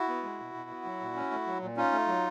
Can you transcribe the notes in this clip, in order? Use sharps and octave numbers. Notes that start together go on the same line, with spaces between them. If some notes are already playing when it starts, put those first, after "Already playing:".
Already playing: E4 F#4
B3
G#3
B2
B2
B3
F#3
A#2
C#4
A3
F#3
A#2
C#4 D#4 F4
A3
F#3